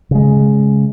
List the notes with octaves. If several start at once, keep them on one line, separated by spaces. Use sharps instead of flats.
C#3 G#3